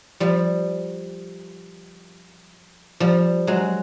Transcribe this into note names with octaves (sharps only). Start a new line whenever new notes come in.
F3 G3
F3 G3
F#3 G#3